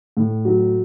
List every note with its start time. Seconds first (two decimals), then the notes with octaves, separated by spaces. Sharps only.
0.17 A2
0.45 F#3